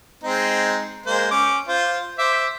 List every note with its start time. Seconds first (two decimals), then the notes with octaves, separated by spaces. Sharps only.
0.23 G#3 C4 D#4
1.06 G#3 A#3 C5
1.31 C#4 D6
1.68 F4 C5
2.19 C5 E5 D6